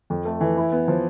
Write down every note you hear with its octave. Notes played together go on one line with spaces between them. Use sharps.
F2
A3
E3
E4
B3
F3